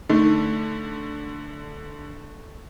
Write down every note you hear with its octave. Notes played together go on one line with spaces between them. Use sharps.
D3 A3 D#4